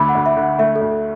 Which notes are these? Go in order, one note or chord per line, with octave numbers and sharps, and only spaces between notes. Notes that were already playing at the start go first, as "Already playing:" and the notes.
Already playing: D2 D3 A3 B5 D6 E6
F#5
D2
E5
D3
F#5
A3 E5
A4
D2
A4